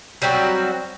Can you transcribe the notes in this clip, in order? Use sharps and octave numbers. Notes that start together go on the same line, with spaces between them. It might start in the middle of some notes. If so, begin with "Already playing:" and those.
F#3 G3 C4 F#4